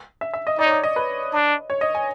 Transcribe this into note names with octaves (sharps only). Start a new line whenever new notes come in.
E5
E5
D#5
D#4 D5
C#5
D5
D#5
B4
D4
C#5
D#5
G#5